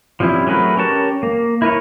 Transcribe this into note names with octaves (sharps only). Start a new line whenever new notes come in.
F3 G3 C4 C#4 E4
F#3 A3 G#4 A#4 B4
C#4 G4 A#4 C#5 A5
A#3
E4 A#4 B4 C#5